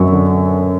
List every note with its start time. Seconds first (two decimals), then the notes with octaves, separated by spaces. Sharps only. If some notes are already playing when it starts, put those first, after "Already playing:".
Already playing: F#2 F#3 C#6
0.13 D3